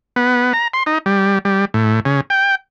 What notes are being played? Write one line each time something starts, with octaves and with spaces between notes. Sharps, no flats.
B3
A#5
C6
D#4
G3
G3
A2
C#3
G5